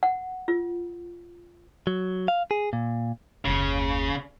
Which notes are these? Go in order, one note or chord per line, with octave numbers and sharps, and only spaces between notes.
F#5
F4
F#3
F5
G#4
A#2
F#1 D#2 C#3